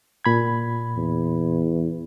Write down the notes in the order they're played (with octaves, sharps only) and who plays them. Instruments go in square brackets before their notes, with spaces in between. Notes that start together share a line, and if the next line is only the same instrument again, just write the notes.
[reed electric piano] A#2 B5 G#6
[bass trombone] E2